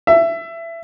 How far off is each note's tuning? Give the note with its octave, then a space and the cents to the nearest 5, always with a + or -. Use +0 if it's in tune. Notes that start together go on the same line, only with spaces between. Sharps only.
E5 +20